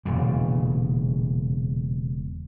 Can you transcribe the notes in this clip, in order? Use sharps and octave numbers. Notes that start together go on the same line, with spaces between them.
E1 A#2 C#3